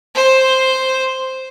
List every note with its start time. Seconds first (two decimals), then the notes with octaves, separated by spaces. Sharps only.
0.15 C5